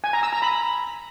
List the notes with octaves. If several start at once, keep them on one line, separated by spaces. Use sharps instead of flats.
G#5
A#5
E6
A#5
B5